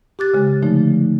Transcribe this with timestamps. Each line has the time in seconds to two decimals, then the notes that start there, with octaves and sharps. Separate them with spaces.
0.19 G4 D6 F#6 A6
0.34 C#3 G#3
0.62 D3 F3 A3 D#4